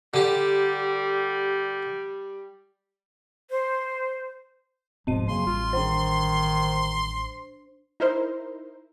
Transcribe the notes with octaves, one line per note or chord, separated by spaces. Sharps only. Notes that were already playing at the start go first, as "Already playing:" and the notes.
D3 G3 G4
C5
D1 G#2 B2 F3 C4 D#5 D#7
F#2 C#3 F#3 A#3 C6
A1 G3 F4
D#3 D4 C5
D#4 E4 A#4 C5